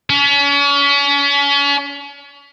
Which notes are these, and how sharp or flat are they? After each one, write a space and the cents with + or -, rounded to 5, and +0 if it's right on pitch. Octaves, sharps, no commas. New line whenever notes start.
C#4 +35